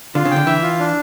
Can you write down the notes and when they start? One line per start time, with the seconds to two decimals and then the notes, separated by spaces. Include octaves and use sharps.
0.15 D3 F4
0.25 C#3
0.31 G5
0.36 D3
0.46 E3 E5
0.63 F4
0.79 D4